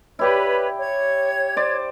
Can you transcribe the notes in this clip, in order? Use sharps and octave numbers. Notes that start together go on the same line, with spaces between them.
E4 G4 B4 C#5 D5
C#5 G#6
C5 D5